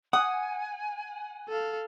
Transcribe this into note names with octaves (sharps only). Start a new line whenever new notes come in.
F#5 G#5 D#6
A4 F5